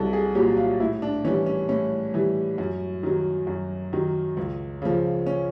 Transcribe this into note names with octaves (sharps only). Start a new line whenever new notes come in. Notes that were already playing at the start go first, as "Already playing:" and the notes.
Already playing: C2 F#3 A4
G#4
A#2 F#3 G4
F4
A2 E4
D4
E3 G3 C#4
C#4
A2 C#4
E3 G3
F#2
D#3 F#3
F#2
D#3 F#3
C#2
C#3 F3
C#4